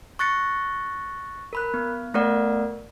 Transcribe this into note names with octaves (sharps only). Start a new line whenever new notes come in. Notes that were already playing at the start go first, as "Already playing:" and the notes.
C#6 F#6 A6 A#6 C#7
A#4 B5 F#6
B3
A3 B3 A#4 D5 F#5